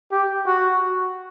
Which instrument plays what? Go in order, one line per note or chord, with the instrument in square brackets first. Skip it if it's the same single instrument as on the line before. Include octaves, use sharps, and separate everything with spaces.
[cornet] G4
F#4